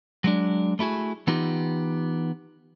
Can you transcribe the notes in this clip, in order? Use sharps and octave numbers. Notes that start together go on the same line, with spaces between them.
F#3 G#3 D4
A3 E4 F#4 G#4
E3 B3 D#4 F4 G4